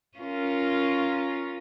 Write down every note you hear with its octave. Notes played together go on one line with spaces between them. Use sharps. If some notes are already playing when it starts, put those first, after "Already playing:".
C#4 F4 A#4